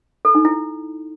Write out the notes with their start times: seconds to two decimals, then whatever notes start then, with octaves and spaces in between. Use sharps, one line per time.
0.25 A4
0.35 D#4
0.45 E4